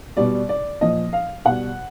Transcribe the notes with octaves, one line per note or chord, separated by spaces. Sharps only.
B2 G3 D5
D5
A#2 F3 D#5
F5
B2 G3 F#5